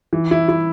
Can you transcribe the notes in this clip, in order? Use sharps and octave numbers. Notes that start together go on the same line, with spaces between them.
E3
E4
E4